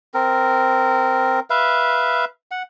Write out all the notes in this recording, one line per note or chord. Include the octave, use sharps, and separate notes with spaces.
C4 A#4
B4 E5 F5
F#5